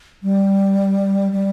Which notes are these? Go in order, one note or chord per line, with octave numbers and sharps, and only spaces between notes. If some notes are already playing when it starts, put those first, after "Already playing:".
G3
G3